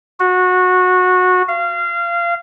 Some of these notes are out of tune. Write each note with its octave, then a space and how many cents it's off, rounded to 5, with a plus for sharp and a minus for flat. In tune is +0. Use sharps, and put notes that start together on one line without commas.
F#4 -20
F5 -25